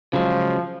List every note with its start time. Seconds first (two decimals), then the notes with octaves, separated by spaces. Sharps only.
0.13 C#3 F3 F#3 G#3